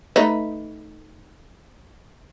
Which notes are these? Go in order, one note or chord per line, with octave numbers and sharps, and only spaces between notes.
A3 D#4 B4